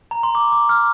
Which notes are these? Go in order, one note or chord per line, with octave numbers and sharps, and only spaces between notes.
A#5
C6
D6
D6
F6